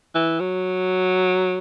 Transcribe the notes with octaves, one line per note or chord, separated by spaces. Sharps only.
E3
F#3